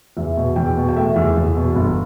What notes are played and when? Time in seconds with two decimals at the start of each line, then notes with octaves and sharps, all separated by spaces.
0.17 E2 E5
0.37 B2
0.56 E2 G5
0.77 B2
0.89 G5
0.96 A3 E5
1.16 E2
1.36 E2
1.56 B2
1.76 G1